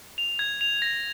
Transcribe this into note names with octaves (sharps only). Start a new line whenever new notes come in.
F7
G#6
F7
A#6